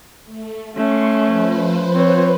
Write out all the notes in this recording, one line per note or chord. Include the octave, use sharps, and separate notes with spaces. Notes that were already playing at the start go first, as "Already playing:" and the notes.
A3
A3 C#4 C6 C#6
F3 B4 C5
C4 C#5